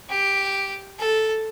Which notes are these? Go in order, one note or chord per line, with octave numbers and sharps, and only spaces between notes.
G4
A4